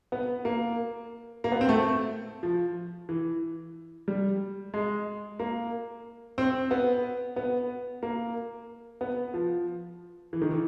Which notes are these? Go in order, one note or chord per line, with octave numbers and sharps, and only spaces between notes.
B3
A#3
A#3
B3
C4
A3
F3
E3
G3
G#3
A#3
C4
B3
B3
A#3
B3
F3
E3
D#3
E3